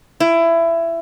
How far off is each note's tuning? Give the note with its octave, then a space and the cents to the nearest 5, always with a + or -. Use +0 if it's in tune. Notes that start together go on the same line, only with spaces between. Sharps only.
E4 +20